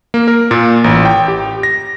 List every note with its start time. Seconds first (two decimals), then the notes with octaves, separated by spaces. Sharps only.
0.14 A#3
0.28 A#4
0.51 A#2
0.84 A1
1.05 G5
1.28 G4
1.63 A#6